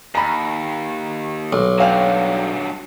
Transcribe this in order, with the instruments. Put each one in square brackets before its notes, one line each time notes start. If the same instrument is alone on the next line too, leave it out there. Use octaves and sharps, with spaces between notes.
[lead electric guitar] D#2 [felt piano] A#5 B5
[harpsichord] B1
[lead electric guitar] G2 F#3 [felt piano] C#5 F5 G5